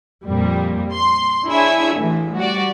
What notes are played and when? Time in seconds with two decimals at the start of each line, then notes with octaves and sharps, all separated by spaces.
0.25 F2 A#2 G3
0.92 C6
1.47 D4 E4 G#4 C#5 E5
1.96 A1 E3
2.37 G3 F#4 D5